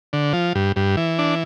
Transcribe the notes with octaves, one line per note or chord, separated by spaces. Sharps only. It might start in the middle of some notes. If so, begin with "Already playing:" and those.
D3
F3
G2
G2
E3
D4